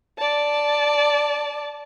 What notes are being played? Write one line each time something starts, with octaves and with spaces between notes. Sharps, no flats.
D5 A5